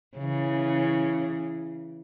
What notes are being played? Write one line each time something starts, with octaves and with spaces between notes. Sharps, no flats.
C#3 E3